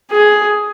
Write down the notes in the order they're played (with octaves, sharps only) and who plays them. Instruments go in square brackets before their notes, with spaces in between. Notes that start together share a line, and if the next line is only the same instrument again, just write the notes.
[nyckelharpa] G#4